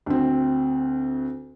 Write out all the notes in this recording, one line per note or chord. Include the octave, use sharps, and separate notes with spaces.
D2 C4